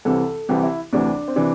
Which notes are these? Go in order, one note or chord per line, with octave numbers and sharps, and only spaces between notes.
C2 C3 E3 A4
C2 C3 E3 G4
E4
D2 C3 E3 D4
C4
C3 E3 D4